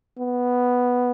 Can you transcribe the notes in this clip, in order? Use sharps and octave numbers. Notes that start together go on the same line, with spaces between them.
B3